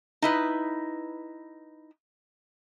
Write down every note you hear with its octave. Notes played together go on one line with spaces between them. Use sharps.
D#4 E4 B4